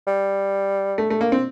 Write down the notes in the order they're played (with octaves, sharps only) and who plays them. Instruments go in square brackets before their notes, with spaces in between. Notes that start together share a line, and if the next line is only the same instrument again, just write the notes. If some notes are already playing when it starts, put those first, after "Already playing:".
[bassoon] G3
[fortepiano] A3
A3
A#3
C4